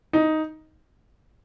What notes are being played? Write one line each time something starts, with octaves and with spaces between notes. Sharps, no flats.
D#4